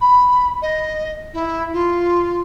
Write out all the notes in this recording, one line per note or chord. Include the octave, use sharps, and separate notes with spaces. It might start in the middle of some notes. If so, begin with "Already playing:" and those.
B5
D#5
E4
F4